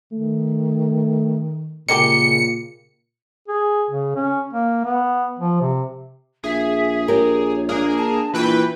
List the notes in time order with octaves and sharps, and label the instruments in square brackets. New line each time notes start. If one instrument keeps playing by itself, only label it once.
[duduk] D#3 [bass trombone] A3
[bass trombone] A#2 [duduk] C#3 [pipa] G#3 A#3 G4 [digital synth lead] C#7
[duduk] G#4
C#3
C#4
A#3
B3
F3
C3
[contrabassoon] A#1 [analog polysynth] G#4 [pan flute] E5
[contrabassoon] A#1 [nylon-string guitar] G4 A#4 [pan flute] C#5
[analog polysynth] A#3 G#4 A#4 [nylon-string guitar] D4
[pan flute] A5
[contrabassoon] A#2 [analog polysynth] E3 B4 G5 [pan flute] F#4